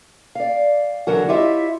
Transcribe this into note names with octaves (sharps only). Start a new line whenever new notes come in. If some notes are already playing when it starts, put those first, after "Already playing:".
D5 F5
E2 D3 F#3 A#4 F#5
E4 F4 G4 C#5 D#5 E5